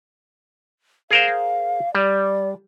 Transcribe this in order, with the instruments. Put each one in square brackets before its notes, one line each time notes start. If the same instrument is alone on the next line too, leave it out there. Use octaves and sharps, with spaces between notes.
[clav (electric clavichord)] G#4 A#4 C5 [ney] F5
[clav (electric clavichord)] G3 [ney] D5